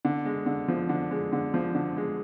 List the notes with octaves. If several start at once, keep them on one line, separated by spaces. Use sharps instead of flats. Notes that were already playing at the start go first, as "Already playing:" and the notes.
D3
G#3
D3
F3
D3
G#3
D3
F3
D3
G#3